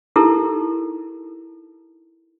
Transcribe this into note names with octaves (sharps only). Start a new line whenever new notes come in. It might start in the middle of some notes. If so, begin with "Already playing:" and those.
D#4 E4 G4 A4 A#4